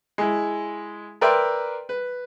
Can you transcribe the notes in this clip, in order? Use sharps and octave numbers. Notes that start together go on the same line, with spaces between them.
G#3 E4
A#4 B4 D5 E5 G5 C6
B4